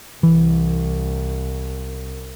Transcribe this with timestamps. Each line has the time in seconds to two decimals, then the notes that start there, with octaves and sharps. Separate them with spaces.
0.23 C2 E3